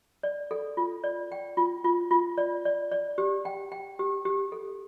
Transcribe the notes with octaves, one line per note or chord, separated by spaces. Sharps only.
D5
A4
F4
D5
G5
F4
F4
F4
D5
D5
D5
G4
G5
G5
G4
G4
A4